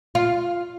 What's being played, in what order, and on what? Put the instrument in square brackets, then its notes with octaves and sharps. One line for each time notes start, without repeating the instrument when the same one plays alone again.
[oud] F4